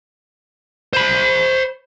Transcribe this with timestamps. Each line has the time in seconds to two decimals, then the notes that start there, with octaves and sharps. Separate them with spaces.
0.93 C5 B5